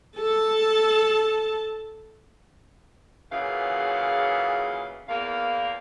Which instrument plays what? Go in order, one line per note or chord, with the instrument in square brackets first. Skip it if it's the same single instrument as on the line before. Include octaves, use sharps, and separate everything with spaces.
[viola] A4 A5
[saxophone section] A#2 C#3 E3 F#3 G#4 F5
E2 A#3 F5